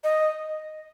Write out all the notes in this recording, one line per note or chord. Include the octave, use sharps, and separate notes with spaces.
D#5